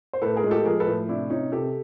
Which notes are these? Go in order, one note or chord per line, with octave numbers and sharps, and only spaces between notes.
C5
A2 A4 B4
G#4 A#4
G#3
G4 A4
F3 G#4 A#4
A4 B4
A2
C3 D4 E4
C3 C#4 D#4
C3 G4 A4